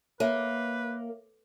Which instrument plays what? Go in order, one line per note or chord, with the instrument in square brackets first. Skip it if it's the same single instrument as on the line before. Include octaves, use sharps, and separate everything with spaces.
[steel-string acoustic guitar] A#3 [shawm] B4 [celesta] C#5 E5